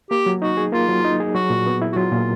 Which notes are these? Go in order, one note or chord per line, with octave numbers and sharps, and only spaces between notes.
A#3 G4
F#3
D#4 F#4
G#4
A#3 F4
F#3
D#4
G#4
F#3 F#4
A#2
B3
E4
F#4
F#3 F4
A#2